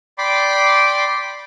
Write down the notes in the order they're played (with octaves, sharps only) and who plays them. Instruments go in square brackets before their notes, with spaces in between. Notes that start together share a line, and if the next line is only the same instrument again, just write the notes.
[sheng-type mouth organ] D5 G5 B5 C6 D6